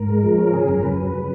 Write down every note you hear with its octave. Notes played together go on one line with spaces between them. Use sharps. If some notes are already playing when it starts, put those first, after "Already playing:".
Already playing: G#2 A#4
G#3
F3
C#4
C#3 G#4
F#2 A#4
F#2 B4
F#3
C#3